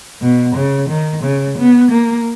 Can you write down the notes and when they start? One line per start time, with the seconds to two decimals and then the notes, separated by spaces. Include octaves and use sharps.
0.22 B2
0.55 C#3
0.89 D#3
1.23 C#3
1.58 B3
1.91 A#3